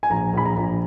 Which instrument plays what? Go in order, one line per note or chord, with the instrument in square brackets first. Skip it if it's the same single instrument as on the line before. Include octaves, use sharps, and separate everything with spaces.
[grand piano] G#5
A#1 A#5
A#1 B5
A#5
A#1